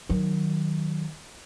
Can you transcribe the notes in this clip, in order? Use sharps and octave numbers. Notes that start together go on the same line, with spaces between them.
D#3 F#3